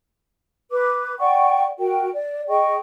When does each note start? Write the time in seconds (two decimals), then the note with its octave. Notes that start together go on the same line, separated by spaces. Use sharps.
0.72 B4 D6
1.19 D5 F#5 G5 C#6
1.78 F#4 A#4 G5
2.14 D5
2.49 G#4 D#5 G5 C#6